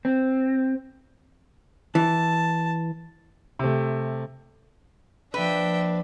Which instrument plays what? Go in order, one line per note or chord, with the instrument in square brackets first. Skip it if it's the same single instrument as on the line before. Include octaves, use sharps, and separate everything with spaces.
[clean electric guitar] C4
[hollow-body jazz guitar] E3 [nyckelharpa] A5
[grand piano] C3 A3
[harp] F3 A#3 [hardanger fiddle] D4 [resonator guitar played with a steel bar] B4 [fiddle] E5 G5